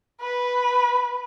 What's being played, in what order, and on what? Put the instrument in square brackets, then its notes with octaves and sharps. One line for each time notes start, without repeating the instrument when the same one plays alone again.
[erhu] B4